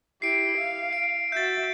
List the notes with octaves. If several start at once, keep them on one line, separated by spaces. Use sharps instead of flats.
E4 G4 C7 D7
F5
D7
F#4 E5 G6 A6